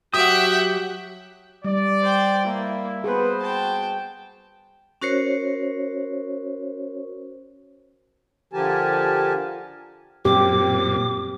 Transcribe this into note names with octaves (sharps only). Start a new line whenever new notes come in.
F#3 F#4 G4 E5 F#5 G5 D#6
G3 D5
C5 G5
A#3 E4
B3 F#4 G#4 B4 C5
G5 A5
C#4 F#4 A#4 C5 C#5
D3 F3 G4 A#4 G#5 A5
F#2 A#2 C4 G4 D6